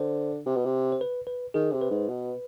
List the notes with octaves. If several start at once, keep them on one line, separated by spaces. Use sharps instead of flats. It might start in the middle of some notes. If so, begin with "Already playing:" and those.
Already playing: D3 C5
C3
B2
C3
C5
B4
B4
D#3 G#4
C3
B4
G#2
B2